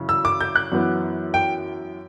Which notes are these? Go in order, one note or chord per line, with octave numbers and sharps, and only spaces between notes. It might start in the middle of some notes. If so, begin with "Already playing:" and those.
Already playing: F#2 C#3 E3
E6
D6
G6
F#6
F#2 E3 B3
G5